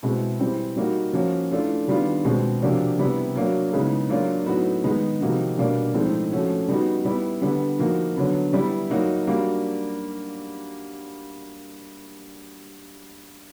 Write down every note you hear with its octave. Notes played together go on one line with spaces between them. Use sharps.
B2 G#3 C4 E4
E3 G3 C4
G3 A#3 D#4 F#4
F3 A#3 C#4 F#4
E3 A3 D4 F4
D#3 G3 B3 D4 F4
B2 G#3 C4
C3 F3 A#3 D4 F#4
C3 E3 G3 B3 E4
F#3 A#3 D4 F#4
C#3 E3 G#3 B3 D#4
F#3 A#3 D4 F4
A2 F#3 B3 D#4 F#4
D#3 G#3 B3 D#4
C3 F3 A#3 D#4 F#4
B2 G3 A#3 D4
A2 F3 G#3 C4 D#4
F3 A3 C#4 F#4
G3 B3 D#4 F#4
G3 B3 E4
D3 G3 B3
F3 A#3 D#4 F#4
D3 F#3 B3
G3 B3 E4
F#3 A#3 D#4 F#4
G3 A#3 D4 F#4